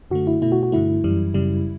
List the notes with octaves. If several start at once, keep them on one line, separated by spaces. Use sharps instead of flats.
F#2 D3 A3 F#4
E4
B2 A3 E4
F#4
F#4
G2 D3 A3 E4
F#2 E3 G3
F#2 C#3 G3